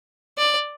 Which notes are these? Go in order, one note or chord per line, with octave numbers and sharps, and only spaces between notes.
D5